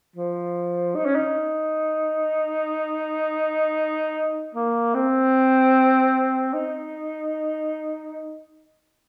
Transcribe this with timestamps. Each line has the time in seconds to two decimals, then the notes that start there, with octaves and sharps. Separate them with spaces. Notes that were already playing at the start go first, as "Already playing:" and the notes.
0.16 F3
0.95 D#4
1.05 C#4
1.15 D#4
4.55 A#3
4.94 C4
6.53 D#4